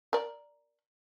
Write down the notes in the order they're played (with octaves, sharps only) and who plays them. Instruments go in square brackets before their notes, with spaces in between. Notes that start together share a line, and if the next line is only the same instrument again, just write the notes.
[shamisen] A#4 D5